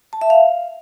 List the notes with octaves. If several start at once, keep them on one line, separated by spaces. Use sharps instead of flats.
A5
E5
F5